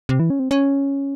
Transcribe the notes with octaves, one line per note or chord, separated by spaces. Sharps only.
C3
E3
C#4
C4
C#4